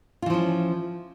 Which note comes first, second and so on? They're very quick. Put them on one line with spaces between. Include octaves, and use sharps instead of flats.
F4 E3 F3 C#4